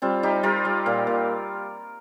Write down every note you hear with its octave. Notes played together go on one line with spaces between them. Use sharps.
G3 C4 F4
G3 D#4 G4
G3 F4 A#4
G3
A#2
A#2